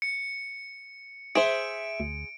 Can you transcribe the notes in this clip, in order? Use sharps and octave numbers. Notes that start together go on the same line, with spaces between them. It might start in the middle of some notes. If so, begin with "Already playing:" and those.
C#7
G#4 C5 E5 D7
D2